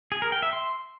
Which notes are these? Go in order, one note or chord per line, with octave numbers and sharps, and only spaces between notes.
G#4
A#4
G5
E5
C6